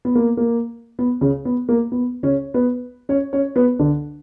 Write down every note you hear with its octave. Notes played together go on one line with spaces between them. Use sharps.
B3
A#3
A#3
B3
C#3 C#4
B3
A#3
B3
C#3 C#4
B3 B4
C#4 C#5
C#4 C#5
B3 B4
D3 D4